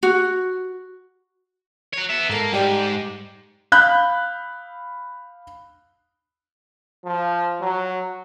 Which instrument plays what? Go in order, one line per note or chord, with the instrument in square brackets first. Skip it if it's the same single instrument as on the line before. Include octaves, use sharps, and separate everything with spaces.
[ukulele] F#4
[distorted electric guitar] F#4 C#5
B3 E5
[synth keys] G#2 A4 C7 [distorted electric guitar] A#3
[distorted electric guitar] G#2 [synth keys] G3 G4 D5
[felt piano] F5 B5 F#6 G6
[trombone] F3
F#3